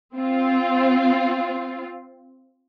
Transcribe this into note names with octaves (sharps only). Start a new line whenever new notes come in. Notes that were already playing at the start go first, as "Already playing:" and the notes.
C4 F4